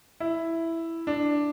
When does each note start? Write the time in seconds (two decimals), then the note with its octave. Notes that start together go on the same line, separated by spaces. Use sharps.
0.20 E4
1.07 D4